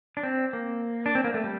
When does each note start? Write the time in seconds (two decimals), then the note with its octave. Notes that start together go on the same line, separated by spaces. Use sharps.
0.17 D4
0.23 C4
0.53 A#3
1.06 D4
1.15 C4
1.24 A#3
1.34 A3
1.44 G3